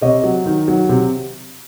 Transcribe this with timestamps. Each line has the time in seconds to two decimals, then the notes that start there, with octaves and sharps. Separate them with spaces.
0.02 C3 C#5 D#5
0.24 F#3
0.46 D#3
0.68 F#3
0.89 C3